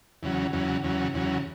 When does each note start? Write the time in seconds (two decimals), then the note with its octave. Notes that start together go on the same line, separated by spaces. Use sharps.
0.23 E2 C#3 F#3
0.53 E2 C#3 F#3
0.83 E2 C#3 F#3
1.14 E2 C#3 F#3